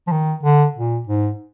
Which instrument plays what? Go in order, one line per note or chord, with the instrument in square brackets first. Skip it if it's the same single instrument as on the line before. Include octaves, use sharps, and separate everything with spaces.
[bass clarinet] F3
D#3
D3
A#2
G#2